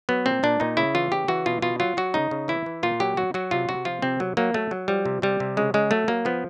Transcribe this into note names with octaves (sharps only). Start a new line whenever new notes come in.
F#3 B3
A#2 C4
A#2 D4
A#2 D#4
C#3 E4
E3 F4
C#3 G4
E3 F#4
B2 F4
B2 F4
F#3 F4
F#3 F#4
C#3 D#4
C#3
E3 E4
E3
A#2 F4
F#3 G4
F#3 F#4
F#3 F#4
C3 F4
C3 F#4
F3 F4
C3 C4
F#3
F#3 A#3
F#3 A3
F#3
F3 G3
C3
C3 G3
C3
C#3 G#3
C#3 G#3
F#3 A3
F#3 A#3
F3 B3